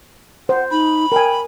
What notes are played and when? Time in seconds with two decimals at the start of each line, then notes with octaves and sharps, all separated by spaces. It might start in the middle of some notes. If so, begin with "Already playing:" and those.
0.49 C5 F#5
0.71 D#4 B5
1.12 A#4 G5 G#5